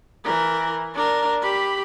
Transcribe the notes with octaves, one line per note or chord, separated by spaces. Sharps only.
E3 A#4
D4 A#4
G4 B5